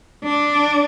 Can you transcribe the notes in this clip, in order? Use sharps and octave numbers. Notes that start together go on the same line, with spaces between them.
D4